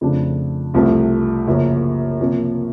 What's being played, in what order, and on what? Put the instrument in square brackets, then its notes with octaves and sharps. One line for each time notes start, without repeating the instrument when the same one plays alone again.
[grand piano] F2 C#3 F3 A3 D4
C2 C3 F3 A3
F#2 C#3 F3 A#3
C3 F3 A#3